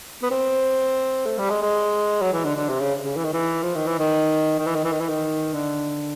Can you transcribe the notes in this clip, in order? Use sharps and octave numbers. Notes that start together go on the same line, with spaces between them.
B3
C4
A3
G3
G#3
G#3
F#3
E3
D3
D3
C3
C#3
C#3
E3
D#3
E3
F3
D#3
E3
D#3
D#3
E3
D#3
E3
D#3
E3
D#3
D3